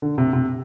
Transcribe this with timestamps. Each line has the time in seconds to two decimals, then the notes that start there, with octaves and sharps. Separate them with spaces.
0.02 D3
0.18 C3
0.33 C3